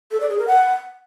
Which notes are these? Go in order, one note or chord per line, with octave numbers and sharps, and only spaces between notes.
A4
D5
G#4
A#4
F#5